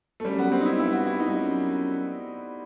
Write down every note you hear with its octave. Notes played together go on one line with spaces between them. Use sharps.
A3
F#2 G3
B3
C4
D#4
E4
F#2
G2 E4
F#4
E4
D#4
G2
F#2